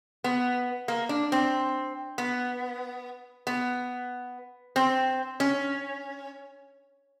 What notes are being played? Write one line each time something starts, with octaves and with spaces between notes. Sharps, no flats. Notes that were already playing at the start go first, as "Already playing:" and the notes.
B3
A#3
D4
C4
B3
B3
C4
C#4